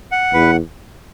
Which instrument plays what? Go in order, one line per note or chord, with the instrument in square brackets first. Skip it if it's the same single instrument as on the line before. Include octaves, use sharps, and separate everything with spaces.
[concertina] F#5
[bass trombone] E2 [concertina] B4